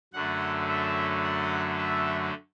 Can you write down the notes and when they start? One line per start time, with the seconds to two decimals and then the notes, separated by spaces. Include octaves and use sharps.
0.13 F#2 D3 F#3 A3 F#5
0.69 E5
1.23 F#5
1.78 E5